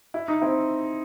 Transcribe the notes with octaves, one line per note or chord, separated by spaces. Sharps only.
E4
D#4
C4 E4